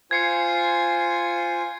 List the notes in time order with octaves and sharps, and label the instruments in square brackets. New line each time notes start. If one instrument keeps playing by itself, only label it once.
[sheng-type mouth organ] F4 C5 G#5 [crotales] G#6 C7 C#7